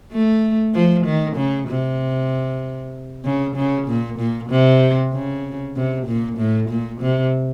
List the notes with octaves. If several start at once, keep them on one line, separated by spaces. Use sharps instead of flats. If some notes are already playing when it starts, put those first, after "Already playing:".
A3
F3
D#3
C#3
C3
C#3
C#3
A#2
A#2
C3
C#3
C3
A#2
A2
A#2
C3